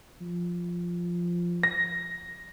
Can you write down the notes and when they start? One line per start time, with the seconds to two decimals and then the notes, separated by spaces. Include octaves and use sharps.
0.21 F3
1.63 A#6